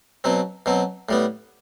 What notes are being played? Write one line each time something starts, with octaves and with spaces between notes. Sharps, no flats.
B2 F#3 C4
B2 F#3 C4
A2 G3 B3